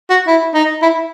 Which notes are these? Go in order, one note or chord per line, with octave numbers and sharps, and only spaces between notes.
F#4
E4
D#4
E4